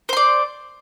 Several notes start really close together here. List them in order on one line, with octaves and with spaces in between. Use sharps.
C5 C6 D5